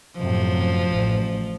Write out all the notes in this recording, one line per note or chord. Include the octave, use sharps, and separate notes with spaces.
F#2 A2 C3 F3
A1